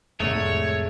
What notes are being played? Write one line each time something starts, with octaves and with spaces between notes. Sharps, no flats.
C2 F2 A2 G#3 A3 C#5